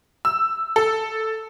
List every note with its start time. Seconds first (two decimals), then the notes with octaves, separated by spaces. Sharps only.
0.25 E6
0.76 A4